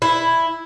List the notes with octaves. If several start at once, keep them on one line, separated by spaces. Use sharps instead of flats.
E4